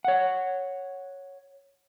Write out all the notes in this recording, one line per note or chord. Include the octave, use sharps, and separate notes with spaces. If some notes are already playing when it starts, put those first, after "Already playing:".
C#5 F#5